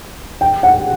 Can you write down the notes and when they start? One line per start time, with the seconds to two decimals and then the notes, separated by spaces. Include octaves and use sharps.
0.41 G5
0.63 F#5